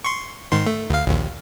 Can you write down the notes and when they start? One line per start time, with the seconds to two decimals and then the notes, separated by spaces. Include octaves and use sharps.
0.04 C6 C#6
0.52 G#2 D#3 C6
0.67 A3
0.90 D2 F5
1.06 A#1 D#2